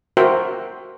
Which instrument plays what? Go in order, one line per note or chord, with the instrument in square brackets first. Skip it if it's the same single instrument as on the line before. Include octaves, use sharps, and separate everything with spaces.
[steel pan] F#4 A#4 C5 E5 G5